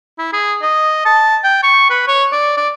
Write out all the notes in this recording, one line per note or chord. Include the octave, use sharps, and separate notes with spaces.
E4
G#4
D#5
A5
G5
C#6
B4
C#5
D5
D5